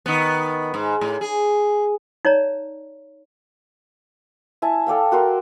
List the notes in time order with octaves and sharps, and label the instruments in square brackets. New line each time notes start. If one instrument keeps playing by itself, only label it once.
[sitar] D#3 B3
G#2
A2
G#4
[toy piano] D#4 C#5 D5 A#5
[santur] E4 G#5 A5
A4 D5 F5 G5
F#4 A#4 C6